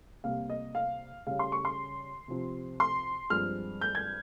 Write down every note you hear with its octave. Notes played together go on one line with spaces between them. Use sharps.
C3 G3 A#3 F5
D#5
F5
C#3 G3 C#4 F5
C6
C#6
C6
C3 F3 C4
C6
G2 F3 G#3 C4 F6
G6
G#6